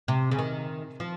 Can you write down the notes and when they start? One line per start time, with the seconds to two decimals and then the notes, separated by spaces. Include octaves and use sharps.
0.08 C3
0.31 C#3
0.39 D#3
1.00 F3